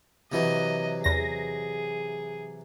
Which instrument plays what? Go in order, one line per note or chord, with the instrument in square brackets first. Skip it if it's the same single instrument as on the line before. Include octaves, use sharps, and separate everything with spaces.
[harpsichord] C3 E3 F#3 [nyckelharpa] D#5
[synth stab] E2 A#6 [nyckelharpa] G#4